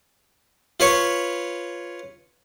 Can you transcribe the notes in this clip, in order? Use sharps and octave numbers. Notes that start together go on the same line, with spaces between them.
F4 B4 C#5 C#6